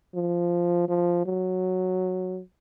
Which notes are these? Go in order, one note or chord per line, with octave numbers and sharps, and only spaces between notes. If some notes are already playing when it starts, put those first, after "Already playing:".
F3
F3
F#3